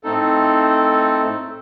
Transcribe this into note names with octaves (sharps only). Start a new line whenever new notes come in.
A2 A3 C4 D#4 A4